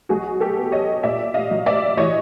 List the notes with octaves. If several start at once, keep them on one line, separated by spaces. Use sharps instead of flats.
B1 F#4 G#4
G4 A4
B3
C#5 D#5
A#2 D5 E5
D#5 F5
F#3
D5 E5
E3 C#5 D#5